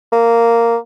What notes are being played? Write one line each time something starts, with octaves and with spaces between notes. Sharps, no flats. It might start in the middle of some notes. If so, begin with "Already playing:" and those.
A#3